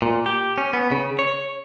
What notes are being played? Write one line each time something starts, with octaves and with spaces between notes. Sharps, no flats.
A#2
G4
C#4
B3
C#3
C#5